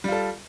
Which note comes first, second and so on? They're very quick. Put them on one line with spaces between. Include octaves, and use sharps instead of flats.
G3 F4 A4